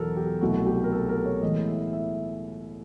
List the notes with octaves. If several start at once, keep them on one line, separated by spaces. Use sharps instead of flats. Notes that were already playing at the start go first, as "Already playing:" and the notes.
Already playing: E2 B2 F#3 A4 A#4
G4
C2 B2 F#3 A3 F#4
G4
A#4
A4
A#4
C#5
A2 E3 G#3 B3 D#5
E5
E5